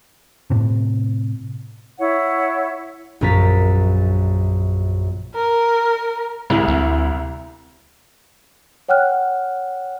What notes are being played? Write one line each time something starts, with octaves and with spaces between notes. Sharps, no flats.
A2 C3
E4 C#5 F#5
A#1 F#2 C#4 A#5 A6 B6
A#4
C2 G#3 E4
D2
C#5 F#5 G5 F6 F#6